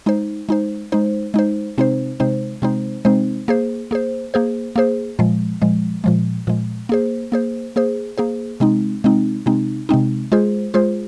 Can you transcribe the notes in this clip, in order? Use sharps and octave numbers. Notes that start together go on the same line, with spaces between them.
G#3 D#4 C5
G#3 D#4 C5
G#3 D#4 C5
G#3 D#4 C5
C3 G#3 C4 D#4 C5
C3 G#3 C4 D#4 C5
C3 G#3 C4 D#4 C5
C3 G#3 C4 D#4 C5
A#3 G#4 C5
A#3 G#4 C5
A#3 G#4 C5
A#3 G#4 C5
A#2 F3 G#3
A#2 F3 G#3
A#2 F3 G#3
A#2 F3 G#3
A#3 G#4 C5
A#3 G#4 C5
A#3 G#4 C5
A#3 G#4 C5
C3 G#3 C4 D#4
C3 G#3 C4 D#4
C3 G#3 C4 D#4
C3 G#3 C4 D#4
G#3 F4 G#4 C5
G#3 F4 G#4 C5